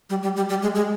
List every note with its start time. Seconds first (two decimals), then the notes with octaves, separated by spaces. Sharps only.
0.10 G3
0.23 G3
0.36 G3
0.49 G3
0.62 G#3
0.75 G#3